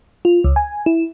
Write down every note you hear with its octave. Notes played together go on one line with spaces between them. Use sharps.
F4
C#2
G#5
E4